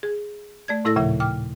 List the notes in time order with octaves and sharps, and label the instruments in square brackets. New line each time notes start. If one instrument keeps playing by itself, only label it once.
[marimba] G#4
A3 D5 G#6
A2 A3 E4 A4 E6 A#6
D#2 A#2 C#3 F3 E5
G5 D6 F6